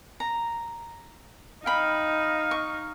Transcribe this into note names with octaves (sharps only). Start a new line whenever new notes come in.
A#5
D#4 F5 G5 B5
C#6